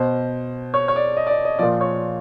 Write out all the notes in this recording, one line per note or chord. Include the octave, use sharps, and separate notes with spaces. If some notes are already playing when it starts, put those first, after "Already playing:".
Already playing: B2 C5
C#5
C#5
D5
D#5
D5
D#5
D#5
A#2 F3 D5
C#5